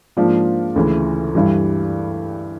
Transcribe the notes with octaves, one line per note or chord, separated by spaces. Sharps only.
G#2 F3 A#3 D4 F4
D2 C#3 E3
G2 E3 G3